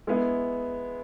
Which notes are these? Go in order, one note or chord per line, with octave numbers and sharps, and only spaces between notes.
G#3 B3 E4